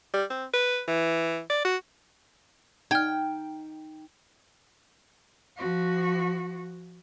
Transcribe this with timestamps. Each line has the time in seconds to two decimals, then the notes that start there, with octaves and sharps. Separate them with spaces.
0.14 G3
0.30 C4
0.54 B4
0.88 E3
1.50 D5
1.65 F#4
2.91 D#4 G5 F6 G#6
5.57 F3 F#4